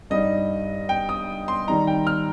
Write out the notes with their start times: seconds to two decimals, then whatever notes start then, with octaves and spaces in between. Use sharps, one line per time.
0.10 G2 G3 D#4 D#5
0.89 G5
1.09 D#6
1.48 C6
1.67 D#3 G3 D#4 A#5
1.87 G5
2.07 F6